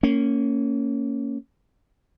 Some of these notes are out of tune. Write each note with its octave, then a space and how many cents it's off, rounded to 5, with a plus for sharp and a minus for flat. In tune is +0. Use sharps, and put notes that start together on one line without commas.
A#3 -20 C#4 +0